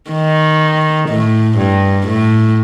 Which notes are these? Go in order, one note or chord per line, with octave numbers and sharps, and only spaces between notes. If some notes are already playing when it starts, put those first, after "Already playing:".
D#3
A2
G2
A2